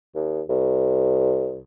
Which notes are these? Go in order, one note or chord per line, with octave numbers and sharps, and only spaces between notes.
D#2
C2